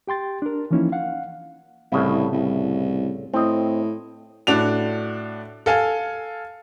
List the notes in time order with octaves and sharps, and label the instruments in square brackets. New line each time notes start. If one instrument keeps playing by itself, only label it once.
[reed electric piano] G4 G5 C6 A6
D4 A#4
E3 F3 A#3 C#4 D#4 E4
F5 F#5
[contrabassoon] C2 [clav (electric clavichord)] A2 C#3 E4
[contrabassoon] C2
[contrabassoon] A2 [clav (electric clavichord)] C4 D#5
[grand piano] A2 D4 F#4 F7
A4 F5 G#5